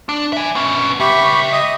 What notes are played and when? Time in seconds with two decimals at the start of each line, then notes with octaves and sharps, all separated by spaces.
0.09 D4
0.33 E5 G#5
0.55 B3 C#4
1.00 C#2 G4 E5 B5 C#6
1.52 D#5 D#6